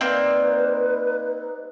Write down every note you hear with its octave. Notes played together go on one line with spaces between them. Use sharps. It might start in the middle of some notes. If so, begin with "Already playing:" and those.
G3 A#3 C4 D4 D#4 B4